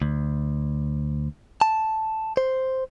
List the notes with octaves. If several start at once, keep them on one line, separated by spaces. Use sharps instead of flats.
D2
A5
C5